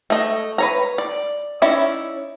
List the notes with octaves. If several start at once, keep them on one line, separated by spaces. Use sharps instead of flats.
A3 D#5
B4 C#5 A#5
D5
C#4 D#4 E4 D5 E5